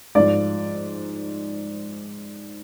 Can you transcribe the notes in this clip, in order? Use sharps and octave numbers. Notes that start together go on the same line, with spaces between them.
G#2 F3 D5